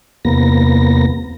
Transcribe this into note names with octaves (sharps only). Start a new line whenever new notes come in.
E2 C3 A#3 B3 A#6